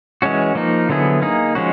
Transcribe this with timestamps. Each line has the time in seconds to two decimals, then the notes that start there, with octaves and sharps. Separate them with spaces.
0.22 E3 G#3 C#4 F#4
0.55 F3 A#3 D#4
0.89 D3 F#3 B3 E4 G#4
1.22 A#3 D#4 G#4
1.55 F3 G#3 C#4 F#4